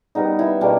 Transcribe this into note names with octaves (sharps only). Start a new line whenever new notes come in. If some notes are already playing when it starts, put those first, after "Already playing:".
D#3 G3 B3 D#4
E4
B2 G3 A#3 D4